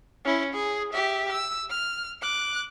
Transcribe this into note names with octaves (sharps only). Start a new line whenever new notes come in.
C#4 E4
G#4
G4 E5
E6
F6
D6 F#6